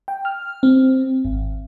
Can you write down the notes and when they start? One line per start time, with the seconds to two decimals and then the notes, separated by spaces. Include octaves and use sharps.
0.08 G5
0.25 F6
0.63 C4
1.25 G#1